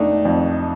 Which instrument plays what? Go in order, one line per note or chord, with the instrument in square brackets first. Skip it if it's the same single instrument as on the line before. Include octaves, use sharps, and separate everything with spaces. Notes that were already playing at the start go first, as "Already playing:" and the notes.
Already playing: [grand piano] F2 A3 D4 D#4
F2